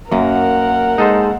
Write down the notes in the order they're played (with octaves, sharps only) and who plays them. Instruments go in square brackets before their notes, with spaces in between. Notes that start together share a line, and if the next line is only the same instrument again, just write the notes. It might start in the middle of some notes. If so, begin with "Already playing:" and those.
[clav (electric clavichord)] F#2 [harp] A#3 [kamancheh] A#4 F#5
[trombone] G#3 [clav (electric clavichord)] D#4 A4 C5